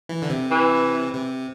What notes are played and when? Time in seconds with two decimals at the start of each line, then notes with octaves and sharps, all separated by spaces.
0.09 E3
0.22 D3
0.30 C3
0.51 E3
1.14 C3